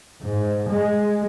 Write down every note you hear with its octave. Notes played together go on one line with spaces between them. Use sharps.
G#2
G#3